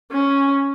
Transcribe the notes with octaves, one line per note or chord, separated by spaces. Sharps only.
C#4